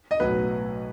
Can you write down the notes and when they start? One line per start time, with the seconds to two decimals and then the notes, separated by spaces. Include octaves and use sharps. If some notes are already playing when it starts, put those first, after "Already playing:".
0.11 D#5
0.20 B1 A2 F#3 B4